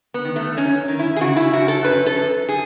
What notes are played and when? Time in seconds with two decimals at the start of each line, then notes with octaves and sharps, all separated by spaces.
0.14 B3
0.25 D#3
0.36 A3
0.57 F#2 C#4
0.88 D#3
0.99 E4
1.16 G#4
1.21 C#3 F#4
1.37 E4
1.53 F#2 F#4
1.68 A4
1.85 F#2 B4
2.06 A4
2.17 F#2
2.49 G#4